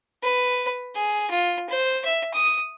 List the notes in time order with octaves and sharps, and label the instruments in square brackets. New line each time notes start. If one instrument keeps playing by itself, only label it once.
[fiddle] B4
G#4
F4
C5
E5
D#6